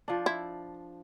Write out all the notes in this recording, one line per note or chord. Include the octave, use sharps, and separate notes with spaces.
F3 D4
E4